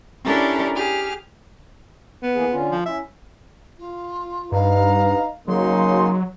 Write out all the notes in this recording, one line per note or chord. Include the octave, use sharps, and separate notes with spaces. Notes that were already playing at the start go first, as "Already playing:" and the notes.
C#4 D4 E4 G4 A4 A#4
G4 G#4 F6
B3
E3 A#3 G#4
D3 C#4 F4
F3
C#4 E4 E5
F4
G2 D#4 B4 F5 A#5
C#3 F#3 A#3 D#4 C6